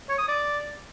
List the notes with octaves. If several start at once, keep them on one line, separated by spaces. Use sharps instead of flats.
C#5
D#6
D5